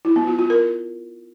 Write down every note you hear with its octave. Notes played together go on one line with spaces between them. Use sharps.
E4
B3
F4
F4
A#4